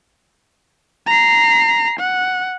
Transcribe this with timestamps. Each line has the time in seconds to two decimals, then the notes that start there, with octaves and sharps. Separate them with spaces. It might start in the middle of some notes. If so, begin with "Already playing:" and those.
1.07 A#5 C7
2.00 F#5